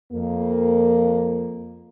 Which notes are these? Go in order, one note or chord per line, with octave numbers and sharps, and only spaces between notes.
F2 A#3